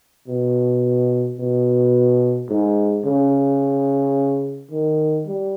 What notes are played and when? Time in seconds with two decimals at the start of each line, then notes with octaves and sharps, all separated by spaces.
0.27 B2
1.38 B2
2.49 G#2
3.05 C#3
4.71 D#3
5.27 G3